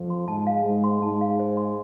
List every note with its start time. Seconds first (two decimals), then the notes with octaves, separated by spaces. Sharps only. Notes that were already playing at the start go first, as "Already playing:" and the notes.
Already playing: F2 F3
0.10 C6
0.27 G#2 G#3 A5
0.47 F5
0.65 G#2 G#3 C5
0.84 C6
1.01 G#2 G#3 A5
1.21 F5
1.40 C5
1.57 C6